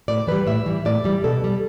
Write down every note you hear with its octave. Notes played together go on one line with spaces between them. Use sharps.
A2 D5
E3 G3 B4
A2 E5
E3 G3
A2 D5
E3 G3
B2 A4
G3